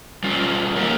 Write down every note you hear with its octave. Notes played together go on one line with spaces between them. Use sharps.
G3 C#4 F4
D#3 A#3 D#4 G4 A#4